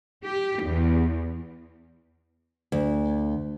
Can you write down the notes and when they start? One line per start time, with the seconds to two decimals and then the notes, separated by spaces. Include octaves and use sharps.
0.24 G4
0.64 E2
2.72 D2